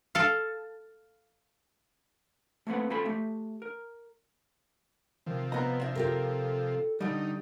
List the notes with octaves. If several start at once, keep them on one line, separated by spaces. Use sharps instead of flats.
A4 F5
A3 A#3 C4 B4 F#5
C4 F4 A4 G#5 A5 B5
A3 G4 E5
A#4
C3 D#3 F3
B3 D#5 A#5
E5
F4 G4 A4 A#4
D3 D#3 G3 D#4